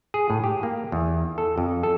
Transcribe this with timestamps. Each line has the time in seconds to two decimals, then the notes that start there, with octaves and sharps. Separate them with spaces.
0.14 G#4
0.30 A2
0.44 G4
0.63 A#3
0.92 E2
1.38 A4
1.58 F2
1.83 A4